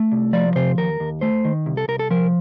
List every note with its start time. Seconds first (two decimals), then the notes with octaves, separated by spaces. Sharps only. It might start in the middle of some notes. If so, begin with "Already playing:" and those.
Already playing: A3
0.12 C2
0.33 F3 D5
0.56 C3 C5
0.78 D#2 A#4
1.00 D#2
1.21 A3 C5
1.45 D#3
1.66 C2
1.77 A4
1.88 C2 A#4
1.99 A4
2.10 F3 A#4